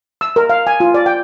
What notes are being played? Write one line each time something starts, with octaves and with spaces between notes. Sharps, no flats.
E6
A#4
F5
G#5
F4
D5
G5